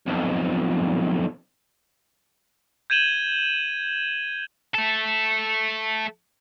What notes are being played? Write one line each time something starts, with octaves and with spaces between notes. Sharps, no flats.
B1 F2
G6 G#6 D#7 E7 F#7 G7
A3 A4